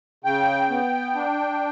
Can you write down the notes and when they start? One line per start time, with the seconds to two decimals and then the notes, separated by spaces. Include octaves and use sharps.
0.24 C#3 G5
0.70 B3
1.15 D4